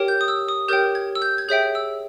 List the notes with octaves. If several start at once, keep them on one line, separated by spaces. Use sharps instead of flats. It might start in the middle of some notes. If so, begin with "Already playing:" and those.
Already playing: G4 A#4 C#5 G5
G6
D#6
E6
D#6
G4 A#4 C#5 G5 G6
G#6
E6
G6
G#6
G#4 C#5 E5 G5 G6
E6